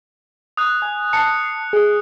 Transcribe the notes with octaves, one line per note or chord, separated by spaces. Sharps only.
D#6 F#6
G#5
A5 C7 C#7
G#4